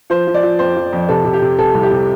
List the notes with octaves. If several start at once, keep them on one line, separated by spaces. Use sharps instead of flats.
F3 C5
F3
D5
F3
F2 C5
F3
F2
C3 A4
C3
G4
C3
C3 A4
C2
G4
C3